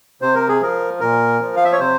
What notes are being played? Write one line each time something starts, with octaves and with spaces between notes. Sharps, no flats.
C3 C5
A#4
G#4
F3 A#4
A#2 A#4
F3
F5
E5
C#5
C3 C5